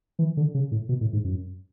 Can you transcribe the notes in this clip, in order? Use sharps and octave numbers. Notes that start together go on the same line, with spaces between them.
E3
D3
C#3
A2
B2
A2
G#2
F#2